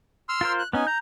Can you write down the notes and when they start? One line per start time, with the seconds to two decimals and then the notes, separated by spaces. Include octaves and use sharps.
0.29 C6 E6 F6
0.41 F4 A#4 C5
0.59 F#6
0.73 B3 C#4 D#4 G#5
0.87 A#5 G6